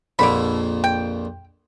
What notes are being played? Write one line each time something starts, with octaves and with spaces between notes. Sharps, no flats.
A#1 F2 A#2 D3 B5
G5